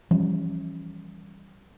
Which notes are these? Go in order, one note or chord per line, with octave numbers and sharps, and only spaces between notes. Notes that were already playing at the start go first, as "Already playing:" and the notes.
E3 F3 G3 C#4